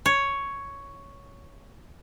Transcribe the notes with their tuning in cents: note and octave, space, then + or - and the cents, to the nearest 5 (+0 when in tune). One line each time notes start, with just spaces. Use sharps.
C#5 +5